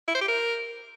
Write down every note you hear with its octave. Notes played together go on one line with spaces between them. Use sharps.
E4
C5
G4
A#4